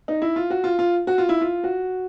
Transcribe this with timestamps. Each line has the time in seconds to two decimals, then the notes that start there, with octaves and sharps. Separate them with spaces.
0.08 D#4
0.22 E4
0.36 F4
0.50 F#4
0.64 F4
0.79 F4
1.07 F#4
1.18 F4
1.29 E4
1.41 F4
1.64 F#4